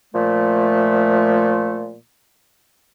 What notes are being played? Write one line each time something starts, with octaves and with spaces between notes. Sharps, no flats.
A#2 F3 A3